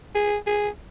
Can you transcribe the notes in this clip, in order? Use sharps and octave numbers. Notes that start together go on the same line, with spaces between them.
G#4
G#4